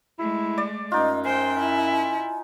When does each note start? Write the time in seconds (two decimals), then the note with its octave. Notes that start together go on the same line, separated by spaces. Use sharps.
0.19 G#3 A3 E4
0.58 D5
0.92 F#2 D#4 F4 D#5
1.25 C5 G5 G#5
1.59 E4